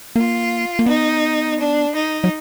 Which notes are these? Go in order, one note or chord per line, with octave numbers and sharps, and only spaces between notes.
A#3 F4
A#3
B3 D#4
D4
D#4
F#3